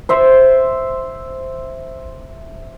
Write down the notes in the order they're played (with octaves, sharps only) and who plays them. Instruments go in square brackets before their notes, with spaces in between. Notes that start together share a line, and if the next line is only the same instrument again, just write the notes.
[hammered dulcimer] C5 E5